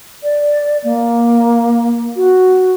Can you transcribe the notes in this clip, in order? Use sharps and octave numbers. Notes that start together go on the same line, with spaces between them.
D5
A#3
F#4